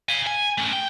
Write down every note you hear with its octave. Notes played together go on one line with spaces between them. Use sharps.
F5 G#5
G#5
A3 C#4
G5